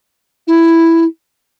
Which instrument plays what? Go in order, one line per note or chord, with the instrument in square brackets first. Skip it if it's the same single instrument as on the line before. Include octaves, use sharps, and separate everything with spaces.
[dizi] E4